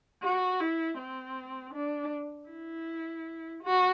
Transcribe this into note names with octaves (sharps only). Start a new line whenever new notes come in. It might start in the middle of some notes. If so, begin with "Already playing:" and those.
F#4
E4
C4
D4
E4
F#4